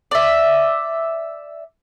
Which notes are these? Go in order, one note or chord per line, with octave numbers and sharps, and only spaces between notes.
D5 E5